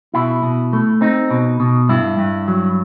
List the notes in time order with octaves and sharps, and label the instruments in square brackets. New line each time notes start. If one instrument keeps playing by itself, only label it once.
[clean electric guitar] B2 E4
B2
A3
C4 D#4
B2
B2
G2 E4
G2
F#3